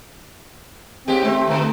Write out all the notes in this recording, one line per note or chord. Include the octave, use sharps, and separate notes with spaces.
D#2 G#3 C4 G4
A3 C4
D3 E3